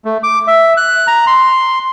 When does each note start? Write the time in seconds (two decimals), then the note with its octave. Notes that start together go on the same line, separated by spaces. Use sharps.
0.05 A3
0.23 D6
0.47 E5
0.77 F#6
1.07 A#5
1.27 C6